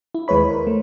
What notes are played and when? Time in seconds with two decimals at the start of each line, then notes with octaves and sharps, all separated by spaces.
0.15 E4
0.28 D#2 G#3 B4 C#5 B5
0.49 A#4 C5
0.67 A3